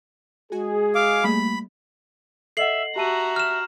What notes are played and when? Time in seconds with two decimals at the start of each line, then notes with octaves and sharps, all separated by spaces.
0.52 G#3 F#4 G#4 G#5
0.95 F5 D6
1.24 G3 A3 A#3 B5
2.57 A4 D#5 E5 F#5 C7 F#7
2.96 F#4 G4 E5 A5 A#5 D#7
3.36 F6 E7